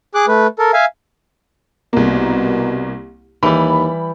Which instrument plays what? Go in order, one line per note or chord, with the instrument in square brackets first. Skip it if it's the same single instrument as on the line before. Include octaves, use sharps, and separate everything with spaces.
[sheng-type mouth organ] G#4 D6 F#6
A3 B4
A4 A#4
E5 F5 G#5
[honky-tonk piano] C2 A#3 [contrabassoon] B2
[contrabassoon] D#2 [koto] E3 G3 [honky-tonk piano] B5